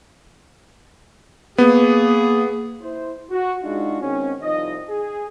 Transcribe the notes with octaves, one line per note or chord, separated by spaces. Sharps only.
A#3 B3 G#4
E4 C5
F#4
G#3 D4 D#4 F4 F#4
G#2 D#3 C4 C#4
C2 F3 D#4 D#5
G#4